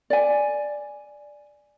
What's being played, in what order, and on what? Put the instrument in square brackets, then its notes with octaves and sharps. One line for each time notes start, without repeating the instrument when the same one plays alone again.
[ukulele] D5 G#5